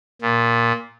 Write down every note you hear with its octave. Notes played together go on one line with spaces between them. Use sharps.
A#2